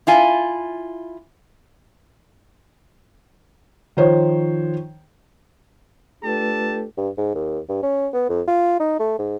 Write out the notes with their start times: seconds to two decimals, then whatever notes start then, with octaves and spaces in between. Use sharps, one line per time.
0.07 E4 F4 G#5
3.97 D#3 F3 C5 C#5
6.23 A3 D4 F4 G4 A4 B4 A5
6.97 G2
7.18 G#2
7.35 D#2
7.69 G2
7.83 C#4
8.13 B3
8.29 F2
8.48 F4
8.80 D#4
9.00 A3
9.19 G#2